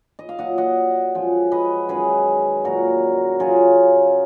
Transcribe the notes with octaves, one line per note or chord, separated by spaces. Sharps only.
D#5
F5
A#2 F#3 D#5 F#5
D#5 F#5
F#2 F3 G#3
B4 D#5
F#2 D#3 G#3 G#4 B4
A#2 F#3 F#4 A#4
F#2 C#3 F#3 F4 G#4